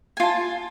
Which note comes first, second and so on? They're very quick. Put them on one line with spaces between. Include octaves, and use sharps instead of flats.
G#5 F4 A5